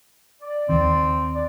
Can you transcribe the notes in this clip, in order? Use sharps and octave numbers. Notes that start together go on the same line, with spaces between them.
D5
D#2 D#3 C4
D5